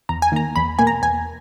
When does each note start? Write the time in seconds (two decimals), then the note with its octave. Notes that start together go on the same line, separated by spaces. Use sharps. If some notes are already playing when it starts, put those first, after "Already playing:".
0.09 E2 A#5
0.22 G#5
0.32 D#3 A#3 A#5
0.56 E2 B5
0.79 B2 A#3 G#5
0.87 A#5
1.02 E2 G#5